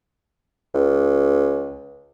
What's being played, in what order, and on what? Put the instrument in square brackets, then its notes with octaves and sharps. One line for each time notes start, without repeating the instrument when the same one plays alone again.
[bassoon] C#2